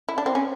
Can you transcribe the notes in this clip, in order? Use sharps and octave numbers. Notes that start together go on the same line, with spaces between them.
E4
D4
C4
C#4